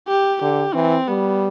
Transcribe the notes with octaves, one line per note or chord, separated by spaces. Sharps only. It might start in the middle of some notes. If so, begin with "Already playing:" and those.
G4
D3 G4
E3 C4
G3 B3